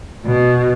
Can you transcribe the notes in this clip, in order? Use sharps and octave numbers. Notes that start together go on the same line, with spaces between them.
B2